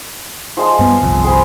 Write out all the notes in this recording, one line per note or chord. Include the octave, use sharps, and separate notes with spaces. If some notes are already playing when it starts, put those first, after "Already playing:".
F3 G#3 F5
G2 B3
G1 C2 F2
G#4 C5 B5